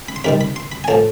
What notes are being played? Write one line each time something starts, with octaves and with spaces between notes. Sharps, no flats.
B5
C6
C3 D#3 G3 B5
B5
C6
B5
G#5
A2 F3 A5